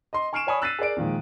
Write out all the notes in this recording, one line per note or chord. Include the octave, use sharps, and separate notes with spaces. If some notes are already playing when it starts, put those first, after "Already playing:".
D#5 C6
G#5 C#6 F6 C7 D7 E7
C#5 D5 G#5 B5 C#6 D#6
E6 F#6 A6 B6 C7 D#7
G#4 A#4 D5 D7
A#2 D#3 F3 G#3